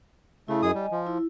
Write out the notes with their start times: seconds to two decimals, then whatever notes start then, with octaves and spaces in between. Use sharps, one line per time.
0.48 C#3 A3 E4
0.63 F#2 G#4 D#5 G#5 D#6
0.75 G3
0.92 F3
1.07 E4